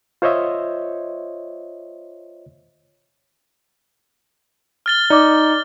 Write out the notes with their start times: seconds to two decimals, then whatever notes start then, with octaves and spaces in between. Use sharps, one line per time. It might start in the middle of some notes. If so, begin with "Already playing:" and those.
0.22 F4 C5 C#5 D#5 E5
4.86 F6 A6 G7
5.10 D#4 D5 D6